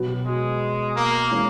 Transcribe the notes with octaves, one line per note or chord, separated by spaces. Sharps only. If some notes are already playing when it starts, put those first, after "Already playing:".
Already playing: B2 F#3 B3 F#4
G#3
A#3
E3 G#3 C#4